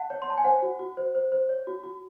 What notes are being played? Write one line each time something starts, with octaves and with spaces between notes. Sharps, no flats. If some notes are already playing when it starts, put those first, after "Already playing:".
Already playing: F#5 A5
C#5
C6
C#5 A5
G#5
C5 F#5
F#4
F#4
C5
C5
C5
C#5
F#4
F#4